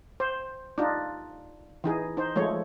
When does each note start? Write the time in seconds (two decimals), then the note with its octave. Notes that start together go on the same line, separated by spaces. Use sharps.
0.20 C5
0.78 D4 D#4 F4
1.84 E3 D#4 G#4
2.17 D#4 C5
2.36 F3 G#3 A3 C#5